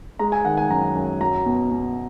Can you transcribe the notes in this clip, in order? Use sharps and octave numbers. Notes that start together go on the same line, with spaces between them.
G#3 A#5
G#5
D#3 F#5
G#5
F#2 A#5
F#2
F#3 A#5
B2
B2